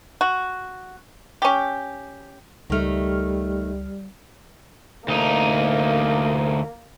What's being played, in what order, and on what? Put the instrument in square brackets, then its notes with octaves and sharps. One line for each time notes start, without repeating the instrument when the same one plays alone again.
[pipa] F#4
C#4 G4
[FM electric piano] C#2 F6 [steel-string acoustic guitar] D#3 A3 [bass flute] G3
[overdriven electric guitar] D2 D#4 [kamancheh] A#3